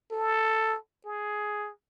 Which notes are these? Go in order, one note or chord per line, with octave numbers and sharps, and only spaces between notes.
A4
G#4